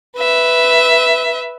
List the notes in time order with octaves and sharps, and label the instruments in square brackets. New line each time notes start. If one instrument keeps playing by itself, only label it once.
[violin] B4 E5